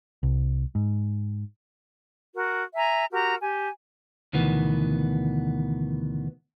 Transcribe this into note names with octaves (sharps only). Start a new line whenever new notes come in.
C2
G#2
F#4 A#4
E5 G#5 A#5
F#4 G4 A#4 A#5
G4 G#5
D2 B2 D#3 E3 B3